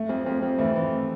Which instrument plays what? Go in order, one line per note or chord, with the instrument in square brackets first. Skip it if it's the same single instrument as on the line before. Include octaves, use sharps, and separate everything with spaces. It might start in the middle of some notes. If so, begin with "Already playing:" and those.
Already playing: [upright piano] A3
[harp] F2
F2
F2
[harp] E3 [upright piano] A3
[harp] E3